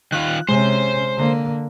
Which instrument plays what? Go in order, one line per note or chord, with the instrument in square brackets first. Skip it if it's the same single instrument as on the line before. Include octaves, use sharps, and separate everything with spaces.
[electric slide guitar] D#3 F4 [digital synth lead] F#6
[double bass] C3 C#4 [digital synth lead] G#3 [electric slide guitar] C5
[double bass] D3 A#3